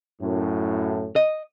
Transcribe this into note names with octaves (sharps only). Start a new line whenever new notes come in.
F#2 A2
D#5